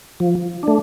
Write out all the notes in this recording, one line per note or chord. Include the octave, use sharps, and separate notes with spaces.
F3
A3 D4